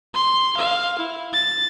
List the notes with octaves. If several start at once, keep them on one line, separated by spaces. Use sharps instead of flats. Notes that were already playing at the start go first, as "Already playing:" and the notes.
C6
F5
E4
A6